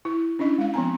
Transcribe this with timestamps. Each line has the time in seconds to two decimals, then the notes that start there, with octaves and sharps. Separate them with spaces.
0.05 E4
0.39 C#4 D4 E4 D#5
0.58 G#3 F5
0.74 F3 B3 C4 A#5